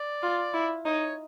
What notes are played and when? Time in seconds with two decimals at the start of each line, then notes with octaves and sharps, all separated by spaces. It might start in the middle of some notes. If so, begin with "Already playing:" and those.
Already playing: D5
0.23 F4
0.54 E4
0.85 D#4 C#5